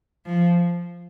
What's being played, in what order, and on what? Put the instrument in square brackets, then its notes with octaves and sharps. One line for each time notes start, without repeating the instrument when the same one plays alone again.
[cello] F3